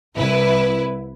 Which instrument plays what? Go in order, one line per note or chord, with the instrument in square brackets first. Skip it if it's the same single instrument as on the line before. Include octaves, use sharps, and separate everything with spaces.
[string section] C2 E4 B4